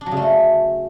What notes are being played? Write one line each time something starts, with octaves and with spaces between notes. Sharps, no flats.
D4
F#3
C#3
A3
F#3